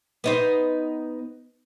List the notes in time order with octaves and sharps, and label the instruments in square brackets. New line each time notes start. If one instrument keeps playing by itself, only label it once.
[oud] B3 D#4 C5